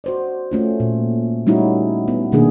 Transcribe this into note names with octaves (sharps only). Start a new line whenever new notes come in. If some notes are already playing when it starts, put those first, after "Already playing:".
F#4 C5 D5
A3 C#4 F4
A#2
G3 A3 C#4 D#4 E4 F#4
B3
B2 D#3 A3 A#3 D4 G#4